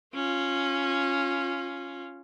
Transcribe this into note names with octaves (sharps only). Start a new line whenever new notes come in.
C#4 F4